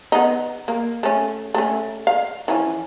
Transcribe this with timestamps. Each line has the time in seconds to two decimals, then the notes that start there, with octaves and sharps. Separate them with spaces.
0.12 B3 D#4
0.68 A#3
1.03 A3 C#4
1.54 A3 C#4
2.07 F5
2.48 E3 F3 C#4